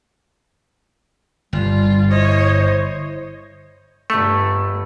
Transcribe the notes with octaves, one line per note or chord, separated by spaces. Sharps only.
G1 G3 F4
E4 C5 C#5 D#5
G1 A3 B5 C#7